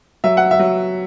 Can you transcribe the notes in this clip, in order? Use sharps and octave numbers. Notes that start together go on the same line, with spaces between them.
F#3 E5
F#5
E5
F#3